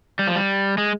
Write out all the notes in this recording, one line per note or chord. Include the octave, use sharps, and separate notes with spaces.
G3
F3
G3
G#3